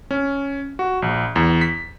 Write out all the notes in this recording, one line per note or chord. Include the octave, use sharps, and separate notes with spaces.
C#4
F#4
A#1
E2
B6